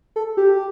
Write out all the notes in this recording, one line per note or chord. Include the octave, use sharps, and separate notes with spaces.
A4
G4